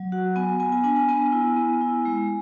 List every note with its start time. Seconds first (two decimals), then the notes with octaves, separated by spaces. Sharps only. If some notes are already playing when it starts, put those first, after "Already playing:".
Already playing: F#3
0.12 F#4 F#5
0.36 B3 G#5
0.60 B3 G#5
0.72 G#5
0.84 D4 G#5
0.96 G#5
1.09 B3 G#5
1.32 E4
1.56 B3
1.81 E4
2.05 G#3